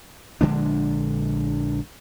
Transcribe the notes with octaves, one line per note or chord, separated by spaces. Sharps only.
A#1 D3 G#3 D4